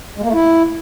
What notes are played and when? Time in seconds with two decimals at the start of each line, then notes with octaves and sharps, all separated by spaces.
0.18 G#3
0.23 A#3
0.28 A3
0.34 E4